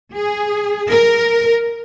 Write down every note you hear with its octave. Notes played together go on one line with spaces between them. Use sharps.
G#4
A#4